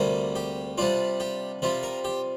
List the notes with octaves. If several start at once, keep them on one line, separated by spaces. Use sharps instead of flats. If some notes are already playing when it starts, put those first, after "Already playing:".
Already playing: D2 C3 G3 A#3
G4
C3 G3 D4 F4
G4
C3 G3 C4 F4
A#4
G4